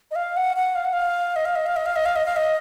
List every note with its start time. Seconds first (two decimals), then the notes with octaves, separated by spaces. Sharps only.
0.11 D#5
0.16 F5
0.37 F#5
0.56 F#5
0.75 F5
0.85 F#5
0.93 F5
1.36 D#5
1.45 F5
1.56 D#5
1.66 F5
1.76 D#5
1.86 F5
1.96 D#5
2.06 F5
2.16 D#5
2.26 F5
2.36 D#5